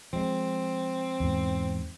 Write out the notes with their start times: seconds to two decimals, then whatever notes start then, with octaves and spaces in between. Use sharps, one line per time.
0.13 F3 G#3 C4
1.20 E2 G#2